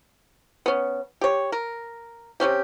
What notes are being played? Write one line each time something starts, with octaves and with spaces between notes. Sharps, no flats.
B3 C#4
G4 C#5
A#4
C3 F#3 C#4 G4